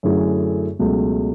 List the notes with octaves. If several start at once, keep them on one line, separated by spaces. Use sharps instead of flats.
F#2 D3 A3 E4 G#4
C#2 B2 F#3 A3